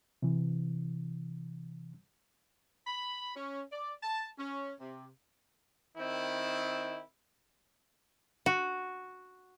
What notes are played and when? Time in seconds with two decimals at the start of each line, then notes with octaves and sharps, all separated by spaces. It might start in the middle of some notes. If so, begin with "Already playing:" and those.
0.23 C3 E3
2.87 B5
3.36 C#4
3.72 D5
4.03 A5
4.39 C#4
4.80 C3
5.97 D#3 C4 E4
8.46 F#4